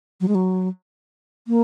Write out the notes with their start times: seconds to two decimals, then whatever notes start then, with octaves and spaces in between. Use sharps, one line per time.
0.21 F#3
0.28 G#3
0.35 F#3
1.48 A#3